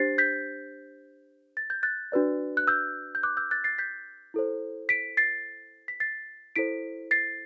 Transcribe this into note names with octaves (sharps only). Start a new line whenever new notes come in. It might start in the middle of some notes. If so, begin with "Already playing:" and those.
Already playing: D4 G4 C5 A6 C7
G6 B6
A6
G6
F#6 A6
D4 F#4 B4 D5
F#6
E6 G6
G6
D6 F#6
E6 G6
F#6 A6
A6 C7
G6 B6
E4 A4 C5
B6 D7
A6 C7
B6
A6 C7
E4 A4 C5 B6 D7
A6 C7